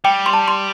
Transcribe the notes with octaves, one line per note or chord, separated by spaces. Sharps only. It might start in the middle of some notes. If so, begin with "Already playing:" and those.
G3 G5
C6
A5
C6